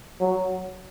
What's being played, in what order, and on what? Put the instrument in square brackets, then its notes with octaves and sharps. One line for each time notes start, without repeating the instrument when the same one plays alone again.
[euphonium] F#3